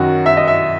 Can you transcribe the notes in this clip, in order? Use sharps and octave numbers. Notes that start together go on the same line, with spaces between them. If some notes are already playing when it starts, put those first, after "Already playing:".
Already playing: F#2 D#3 F#3 F#4
E5
D#5
E5